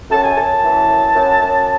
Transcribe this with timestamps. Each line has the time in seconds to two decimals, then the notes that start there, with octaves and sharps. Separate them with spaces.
0.10 F#2 A5
0.24 G#5
0.35 F#2 A5
0.63 E3
0.89 F#2
1.16 F#2
1.42 F#2